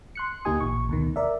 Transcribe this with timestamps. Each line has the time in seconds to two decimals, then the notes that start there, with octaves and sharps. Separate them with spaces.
0.15 C6 F#6 C#7
0.45 D2 A#3 D#4 G4 G#5 D#6
0.60 A1 A#2 C#6
0.89 D2 B2 D#3
1.16 A#4 D5 E5